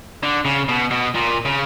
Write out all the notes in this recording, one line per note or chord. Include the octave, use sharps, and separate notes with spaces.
D3
C#3
B2
B2
A#2
C#3